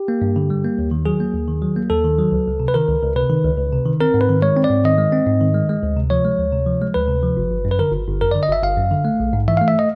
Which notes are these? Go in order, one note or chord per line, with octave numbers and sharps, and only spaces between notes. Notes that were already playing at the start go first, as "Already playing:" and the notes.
Already playing: G4
A#3
G2
D3
G3
A#3
D#2
D#3
F#3 G#4
A#3
D#2
D#3
F#3
A#3
D#2 A4
D#3
F#3
C#2
C#2
C3
B4
D#3 A#4
C#2
C#2
C3 B4
D#3
C#2
C#2
C3
D#3
C4 A#4
G#2
B4
D#3
G#3 C#5
C4
D5
G#2
D#3 D#5
G#3
C4
G#2
D#3
G#3
G#3
D2
C3
F3 C#5
G#3
D2
C3
F3
G#3
D2 B4
C3
F3
G1
G1
F#2
B4
D3 A#4
G1
G1
F#2 A#4
D3 D5
D#5
G1 E5
G1 F5
F#2
D3
A3
A#1
G#2
E3 E5
A3 F5
E5
D#5